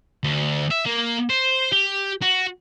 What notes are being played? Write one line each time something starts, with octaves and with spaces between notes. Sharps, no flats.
D2
E5
A#3
C5
G4
F#4